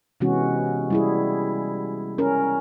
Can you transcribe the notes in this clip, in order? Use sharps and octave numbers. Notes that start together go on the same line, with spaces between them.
C3 E3 G#3 B3 C#4 F#4
G3 E4 G#4
C#4 A#4